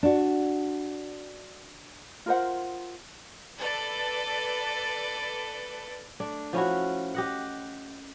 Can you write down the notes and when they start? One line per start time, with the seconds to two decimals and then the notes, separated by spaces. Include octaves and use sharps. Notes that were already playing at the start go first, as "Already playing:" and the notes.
0.03 D4 F#4
2.26 F4 A#4 C5 F#5
3.59 A4 B4 D5
6.20 A3 D4
6.53 F3 C#4 E4 F#4
7.14 G4 D#5 F#5